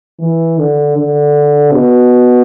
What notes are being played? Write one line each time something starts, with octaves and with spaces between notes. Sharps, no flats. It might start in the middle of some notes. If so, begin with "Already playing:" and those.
E3
D3
D3
B2